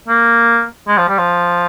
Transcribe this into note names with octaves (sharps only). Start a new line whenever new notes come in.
A#3
G#3
F3
G3
F3